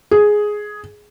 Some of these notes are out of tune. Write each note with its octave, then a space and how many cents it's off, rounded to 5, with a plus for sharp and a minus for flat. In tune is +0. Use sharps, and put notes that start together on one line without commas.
G#4 +5